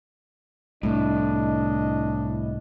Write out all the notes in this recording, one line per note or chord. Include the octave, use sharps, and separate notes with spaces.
C2 A2 A3 D4 D#5